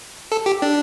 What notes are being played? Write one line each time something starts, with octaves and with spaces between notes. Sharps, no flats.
A4
G4
D4